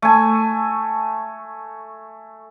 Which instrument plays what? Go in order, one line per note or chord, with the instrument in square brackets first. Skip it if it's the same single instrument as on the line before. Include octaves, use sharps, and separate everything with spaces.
[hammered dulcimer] A3 G#5